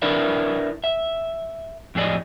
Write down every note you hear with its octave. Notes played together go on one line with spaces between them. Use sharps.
D4 E4 A#4 B4 D5 E5
E5
F2 A2 G#4 D5 D#5